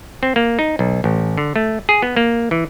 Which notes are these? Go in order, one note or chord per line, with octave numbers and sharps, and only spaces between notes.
C4
A#3
D#4
B1
A1
D3
A3
G#4
B3
A#3
E3